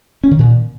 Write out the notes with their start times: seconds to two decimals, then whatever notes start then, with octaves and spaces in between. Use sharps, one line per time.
0.24 C#4
0.31 D#3
0.39 A#2